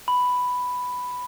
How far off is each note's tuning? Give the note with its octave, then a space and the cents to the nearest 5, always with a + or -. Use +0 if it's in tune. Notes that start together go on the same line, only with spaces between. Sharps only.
B5 +5